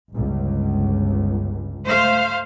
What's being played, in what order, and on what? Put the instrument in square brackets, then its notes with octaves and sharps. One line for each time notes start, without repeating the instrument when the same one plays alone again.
[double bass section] G1 C#2
[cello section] A3 C5 F5